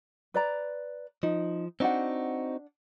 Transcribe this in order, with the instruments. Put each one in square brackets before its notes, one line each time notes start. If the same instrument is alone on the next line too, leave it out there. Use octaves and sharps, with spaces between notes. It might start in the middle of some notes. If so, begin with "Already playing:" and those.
[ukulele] B4 D5 A#5
[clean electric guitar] F3 [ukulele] D#4
[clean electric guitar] C4 D#4 F#4 [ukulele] D4 F#5